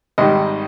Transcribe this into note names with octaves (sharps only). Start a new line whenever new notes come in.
G#1 G#2 D#3 G3 D#5